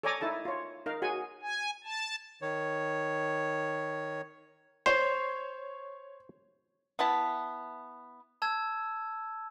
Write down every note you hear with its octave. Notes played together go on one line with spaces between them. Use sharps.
A4 C#5 D5 G#5 A#5 D6
D#4 E4 A4 A5
F4 C#5
D#4 A#4 F5
F#4 G#4 G#5
G#5
A5
D#3 C#5
C5 C#5
B3 E4 A5
A5 E6 G#6